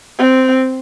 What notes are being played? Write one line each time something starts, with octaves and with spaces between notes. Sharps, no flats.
C4